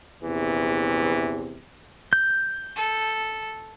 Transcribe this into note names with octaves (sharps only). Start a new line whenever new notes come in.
A#1 E2 C3 E3
G6
A4